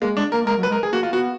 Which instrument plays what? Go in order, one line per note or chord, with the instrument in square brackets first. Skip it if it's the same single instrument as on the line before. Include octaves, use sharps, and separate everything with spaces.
[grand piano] G#3 [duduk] A#3
[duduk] G#3 [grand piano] D4
[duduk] A#3 [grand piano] A#4
[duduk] G#3 [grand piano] A#4
[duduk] F#3
[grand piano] B4
[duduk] G#3
[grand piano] A#4
G#4
[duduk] A#3 [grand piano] F#4
[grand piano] F4
[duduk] B3 [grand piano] F#4